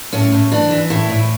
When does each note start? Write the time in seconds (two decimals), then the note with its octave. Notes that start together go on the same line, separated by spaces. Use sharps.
0.13 A2 C#4
0.32 A2
0.51 E3 D4
0.71 E3
0.90 A2 E4
1.10 A2